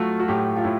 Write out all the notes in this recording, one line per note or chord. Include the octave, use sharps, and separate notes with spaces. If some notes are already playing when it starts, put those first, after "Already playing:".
Already playing: F#3 A3 F4 F#4
F#4
A2 G4
F4
A2 E4